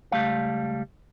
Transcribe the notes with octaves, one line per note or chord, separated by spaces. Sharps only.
C#2 G3 A3 F5